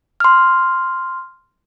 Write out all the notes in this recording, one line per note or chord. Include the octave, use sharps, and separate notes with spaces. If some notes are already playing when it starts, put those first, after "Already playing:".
C6 F6